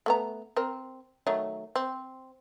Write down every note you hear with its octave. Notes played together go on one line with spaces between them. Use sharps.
A3 B3 A#5
C4 A#4
D#3 F#3 A3
C4